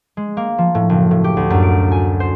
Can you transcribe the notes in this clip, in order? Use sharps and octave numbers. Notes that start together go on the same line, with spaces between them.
G#3
A#3
F3
A2
F#1
A2
G4
D2
F#2
D7
G#5
C5